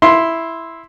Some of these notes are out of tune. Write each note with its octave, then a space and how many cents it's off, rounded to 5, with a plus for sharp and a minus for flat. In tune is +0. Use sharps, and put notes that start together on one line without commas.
E4 +0 C6 +0